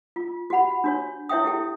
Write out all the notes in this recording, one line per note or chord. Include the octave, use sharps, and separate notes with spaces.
F4
F#4 G4 F#5 B5
D4 F#4 C#5
E4 C#5 E5 G5 D#6
E4 G4 A4 G5